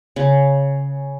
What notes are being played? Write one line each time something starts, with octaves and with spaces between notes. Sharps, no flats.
C#3